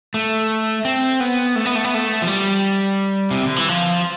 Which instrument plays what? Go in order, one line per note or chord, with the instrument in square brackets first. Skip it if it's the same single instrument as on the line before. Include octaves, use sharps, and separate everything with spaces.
[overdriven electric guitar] A3
C4
B3
A3
B3
A3
B3
A3
F3
G3
C3
D3
E3
F3